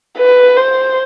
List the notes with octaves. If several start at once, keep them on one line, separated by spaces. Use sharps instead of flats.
B4
C5